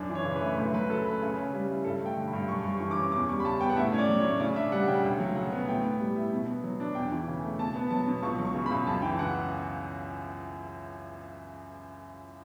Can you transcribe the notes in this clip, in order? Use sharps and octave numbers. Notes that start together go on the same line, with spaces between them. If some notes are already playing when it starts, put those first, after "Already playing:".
Already playing: F#2 D4
E3
C#5
C#3
B4
A3
D2 B4
F#3 B4
C#3 A4
A3 B4
C#3
C#4
G3
E4
G2 A4
A3 G5
D3
B5
G2
F#2 C#6
G3
C#6
E3
D6
C#4
E2 D6
G3 C#6
B5
C#3 A5
B3 G5
F#5
A2 E5
C#4 C#5
D5
F#3
C#5
A2
C#3 D5
D4 E5
G3 F#5
C#3 G5
D2 G5
F#3
C#3 F#5
B3
A2 G5
B3
G3
E4
B2
B3
F#3
D4
E2 G5
E3
C#3
A3
B2 A5
B3
F#3 A5
B2
C#2 C#6
F#3
C#6
C#3
B5
C#2
F#2 A5
E3 G5
C#3 F#5